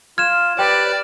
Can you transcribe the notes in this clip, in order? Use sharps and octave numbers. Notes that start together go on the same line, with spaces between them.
F4 F6 G#6 E7
G4 B4 D5 G5 F#6 D7